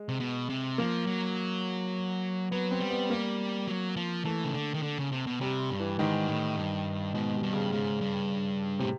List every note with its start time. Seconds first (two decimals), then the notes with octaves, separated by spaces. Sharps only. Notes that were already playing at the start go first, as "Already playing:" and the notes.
Already playing: G#3
0.09 C3
0.20 B2
0.49 C3
0.78 F3 A#3
1.07 F#3
2.51 F#3 B3
2.71 C4
2.80 G3
2.90 B3
3.10 A#3
3.67 F#3
3.96 F3
4.25 E3 A3
4.44 C#3
4.54 D3
4.74 D#3
4.83 D3
4.98 C#3
5.12 C3
5.27 B2
5.41 C3 G3
5.70 G2
5.80 E3
5.99 G#2 D#3
6.28 A2
6.56 G2
7.14 G#2 B2
7.34 C3
7.43 G2
7.53 C#3
7.72 G#2 C#3
8.01 G2
8.79 A2 C3